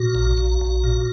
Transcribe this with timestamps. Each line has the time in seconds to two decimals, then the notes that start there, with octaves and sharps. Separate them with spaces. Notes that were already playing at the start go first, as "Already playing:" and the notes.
Already playing: A#2 F#4
0.15 A#1
0.38 A#1
0.61 A#1
0.84 A#2